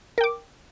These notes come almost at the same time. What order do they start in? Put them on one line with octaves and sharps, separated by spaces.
A#4 G5 D6